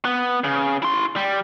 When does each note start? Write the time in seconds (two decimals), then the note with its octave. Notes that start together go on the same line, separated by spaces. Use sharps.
0.05 B3
0.44 C#3
0.82 E4 C6
1.16 G3